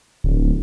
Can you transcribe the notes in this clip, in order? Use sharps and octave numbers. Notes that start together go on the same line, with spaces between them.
D1